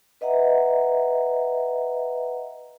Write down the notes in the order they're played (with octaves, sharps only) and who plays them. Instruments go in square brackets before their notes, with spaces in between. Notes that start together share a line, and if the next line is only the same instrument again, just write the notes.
[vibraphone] B4 D#5 E5 F#5 A#5